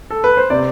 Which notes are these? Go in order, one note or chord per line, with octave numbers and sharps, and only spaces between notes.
A4
B4
C5
C3 D5